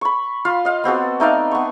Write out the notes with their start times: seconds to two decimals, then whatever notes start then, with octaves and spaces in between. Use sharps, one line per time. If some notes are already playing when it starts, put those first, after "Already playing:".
0.01 B5 C#6
0.45 F4 F5 C6
0.65 D#5 F5
0.84 B3 C4 F#4 A4
1.20 A3 D#4 D5 F5
1.51 B3 C#6